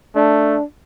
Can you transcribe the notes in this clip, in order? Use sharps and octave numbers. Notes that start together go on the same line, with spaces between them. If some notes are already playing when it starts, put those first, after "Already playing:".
A3 D4